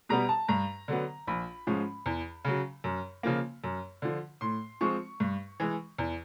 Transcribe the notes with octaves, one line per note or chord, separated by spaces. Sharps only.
B2 G3 B3 A#5
A5
G2 A#5
D3 F#3 B3
A#1 B5
G#2 F3 G#3 C#4
E2
C#3 F#3
F#2
C#3 F3 A#3
F#2
D3 F3
A2 C6
F3 G#3 C4 C#6
G2
E3 G#3
E2